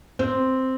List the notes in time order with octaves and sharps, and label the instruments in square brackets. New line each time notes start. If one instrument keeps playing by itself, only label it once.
[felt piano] C4